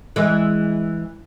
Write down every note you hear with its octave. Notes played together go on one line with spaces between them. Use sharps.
E3 G#3